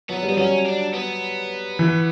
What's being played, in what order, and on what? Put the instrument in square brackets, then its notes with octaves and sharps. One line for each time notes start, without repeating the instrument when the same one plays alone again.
[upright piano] F#3 [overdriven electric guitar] B3
[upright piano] G3
[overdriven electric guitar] B3
[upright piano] F#3 [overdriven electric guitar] C#4
[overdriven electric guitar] D4
B3
[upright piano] E3